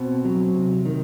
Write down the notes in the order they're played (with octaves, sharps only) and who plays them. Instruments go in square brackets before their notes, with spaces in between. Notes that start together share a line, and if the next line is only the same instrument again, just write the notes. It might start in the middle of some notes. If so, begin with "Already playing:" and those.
Already playing: [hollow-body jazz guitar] B2 C4
F#3
C3
D#3